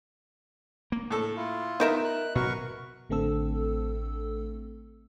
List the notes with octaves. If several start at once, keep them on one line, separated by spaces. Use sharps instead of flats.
A#3
A2 A4
E4 F4
B3 D#4 A#4 E5
F#6
B2 F#3 A#4 B4 C#6
A1 D3 A3 C4 A4 E6